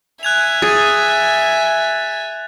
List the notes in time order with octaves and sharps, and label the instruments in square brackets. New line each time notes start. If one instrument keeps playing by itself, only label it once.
[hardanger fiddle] E5 G#5 [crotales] F#6 G#6 F7
[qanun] G#4 [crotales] A6